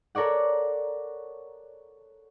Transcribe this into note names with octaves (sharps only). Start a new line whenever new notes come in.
A4 A#4 C#5 D5 F#5